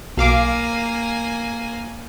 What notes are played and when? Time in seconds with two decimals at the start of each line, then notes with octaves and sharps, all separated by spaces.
0.17 B1 A#3 F5 G#5 D6